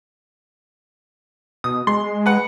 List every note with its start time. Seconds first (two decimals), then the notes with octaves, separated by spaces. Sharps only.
1.64 B2 D#6
1.87 G#3 C6
2.26 B4 F#5